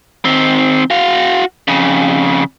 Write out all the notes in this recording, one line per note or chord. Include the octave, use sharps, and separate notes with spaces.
D#3 C4
F#4 F5
F2 C#3